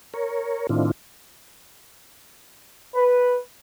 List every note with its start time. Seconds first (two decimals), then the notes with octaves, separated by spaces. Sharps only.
0.14 A#4 C#5
0.69 A2 D#3 C4 D4 E4 F4
2.95 B4